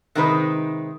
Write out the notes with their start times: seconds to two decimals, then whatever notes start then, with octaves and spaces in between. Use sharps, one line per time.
0.15 C3 D#3 G#3 D#4 B4 C5